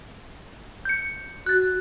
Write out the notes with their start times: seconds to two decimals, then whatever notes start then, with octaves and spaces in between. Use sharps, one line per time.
0.85 G6 C#7
1.46 F#4 F#6 A6